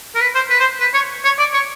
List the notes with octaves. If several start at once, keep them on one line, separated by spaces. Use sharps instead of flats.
A#4
B4
C5
B4
C5
B4
C#5
C#5
D5
C#5